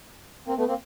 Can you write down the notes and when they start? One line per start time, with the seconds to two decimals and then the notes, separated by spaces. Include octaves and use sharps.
0.47 A#3 C4
0.57 A3 B3
0.67 A#3 C4